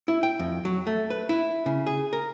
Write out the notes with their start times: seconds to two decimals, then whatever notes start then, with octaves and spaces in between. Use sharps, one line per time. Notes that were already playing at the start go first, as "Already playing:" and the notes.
0.08 E4
0.23 G5
0.39 F2
0.65 F#3
0.87 A3
1.10 B4
1.29 E4
1.66 C#3
1.87 G#4
2.13 A#4